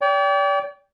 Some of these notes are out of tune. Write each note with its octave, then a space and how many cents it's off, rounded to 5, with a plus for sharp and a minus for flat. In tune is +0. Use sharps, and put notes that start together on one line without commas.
D5 -40 G5 +0